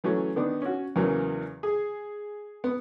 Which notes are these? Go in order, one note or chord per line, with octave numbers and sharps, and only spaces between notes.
E3 F#3 A3 C#4
D#3 B3 D4
C#4 F#4
E2 C#3 E3 F#3 A#3
G#4
B3